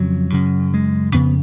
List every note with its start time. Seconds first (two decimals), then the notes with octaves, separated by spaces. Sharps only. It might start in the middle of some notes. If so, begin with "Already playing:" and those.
Already playing: F2 C#3 F#3
0.32 F#2 C#3
0.74 G#3
1.13 F2 C#3 B3